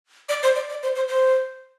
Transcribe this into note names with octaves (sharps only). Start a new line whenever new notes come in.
D5
C5
D5
D5
C5
C5
C5